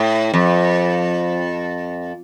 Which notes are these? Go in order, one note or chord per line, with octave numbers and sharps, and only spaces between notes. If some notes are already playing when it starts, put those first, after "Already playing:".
Already playing: A2
F2